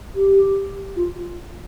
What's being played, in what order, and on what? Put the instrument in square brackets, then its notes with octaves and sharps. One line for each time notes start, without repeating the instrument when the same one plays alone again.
[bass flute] G4
F4